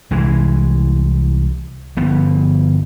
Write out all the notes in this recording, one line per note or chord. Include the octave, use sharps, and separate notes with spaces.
C2 E3 G#3
G1 F3 B3